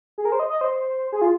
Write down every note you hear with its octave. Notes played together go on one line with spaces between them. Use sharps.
G#4
A#4
C5
D#5
D#5
C5
G#4
F4